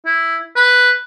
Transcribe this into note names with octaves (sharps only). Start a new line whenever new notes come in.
E4
B4